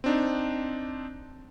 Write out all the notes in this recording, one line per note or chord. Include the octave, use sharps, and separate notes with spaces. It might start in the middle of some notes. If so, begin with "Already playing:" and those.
C4 D4 D#4